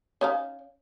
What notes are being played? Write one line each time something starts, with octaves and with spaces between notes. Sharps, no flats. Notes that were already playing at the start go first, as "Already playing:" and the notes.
C#4 D#4 F5